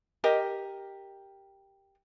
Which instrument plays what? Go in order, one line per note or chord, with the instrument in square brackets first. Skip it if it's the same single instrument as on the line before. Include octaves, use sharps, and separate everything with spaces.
[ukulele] G4 A#4 D#5